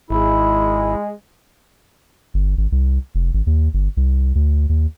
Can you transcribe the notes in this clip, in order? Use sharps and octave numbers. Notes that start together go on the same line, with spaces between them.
G#1 G#3 E4
G1
G#1
C2
F1
G#1
D#2
G1
C2
D2
D#2